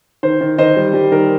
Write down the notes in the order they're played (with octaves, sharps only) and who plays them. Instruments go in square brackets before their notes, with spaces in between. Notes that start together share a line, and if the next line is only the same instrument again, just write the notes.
[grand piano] D#3 C5
D#3
D#3 C5 D#5
G3
G3
D#3 A#4